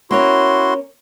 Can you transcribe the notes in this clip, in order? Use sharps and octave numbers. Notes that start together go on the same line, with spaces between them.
A#3 C#4 E4 F#4 C#5 C6